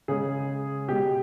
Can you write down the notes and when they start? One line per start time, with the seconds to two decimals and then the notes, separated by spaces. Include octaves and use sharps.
0.08 C#3 G#3 G#4
0.88 B2 G#3 G4